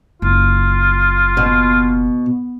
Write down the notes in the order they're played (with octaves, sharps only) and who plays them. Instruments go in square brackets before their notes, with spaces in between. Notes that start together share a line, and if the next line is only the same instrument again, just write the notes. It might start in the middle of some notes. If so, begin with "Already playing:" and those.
[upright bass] F#1 [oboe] F4
[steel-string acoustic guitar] B2